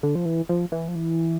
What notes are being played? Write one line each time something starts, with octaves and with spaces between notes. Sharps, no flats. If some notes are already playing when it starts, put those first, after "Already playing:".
D3
F3
E3
F3
E3
F3
E3